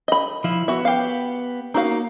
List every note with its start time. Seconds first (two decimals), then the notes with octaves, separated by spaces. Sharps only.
0.08 D#5 B5
0.44 F3 E4
0.68 B3 F#4 E5
0.85 G4 F5
1.74 A#3 D#4 F#4 F5